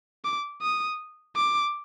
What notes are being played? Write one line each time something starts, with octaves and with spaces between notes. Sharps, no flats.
D6
D#6
D6